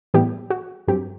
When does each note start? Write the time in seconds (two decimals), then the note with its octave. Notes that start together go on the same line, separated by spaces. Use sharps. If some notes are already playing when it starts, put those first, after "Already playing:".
0.14 A2 E3 G3 B3 G4
0.50 F#4
0.88 G2 F#3 C4 G4